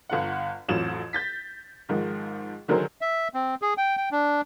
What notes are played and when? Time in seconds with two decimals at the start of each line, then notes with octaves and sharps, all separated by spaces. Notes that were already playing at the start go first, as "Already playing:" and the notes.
0.09 G1 F4 F#5
0.68 A1 F2 F3 F#3 E7
1.13 G6 A6 B6
1.89 G#2 D#3 F3
2.68 D3 D#3 F#3 G#4 A#4 C5
3.01 E5
3.34 C4
3.62 G#4
3.77 G5
3.97 G5
4.12 D4